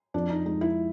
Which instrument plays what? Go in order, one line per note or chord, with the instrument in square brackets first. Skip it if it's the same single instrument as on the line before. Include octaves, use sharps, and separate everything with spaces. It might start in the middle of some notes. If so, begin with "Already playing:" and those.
[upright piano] F2 [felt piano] D4
[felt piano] D#4
[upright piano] G#3 [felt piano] D#4
[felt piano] E4